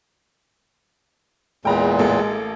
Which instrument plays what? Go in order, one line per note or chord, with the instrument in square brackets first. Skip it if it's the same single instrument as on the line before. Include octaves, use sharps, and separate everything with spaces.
[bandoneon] E2 A#2 [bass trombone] G#3 [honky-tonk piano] G5 A#5 B5
[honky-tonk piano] A1 A#3 A4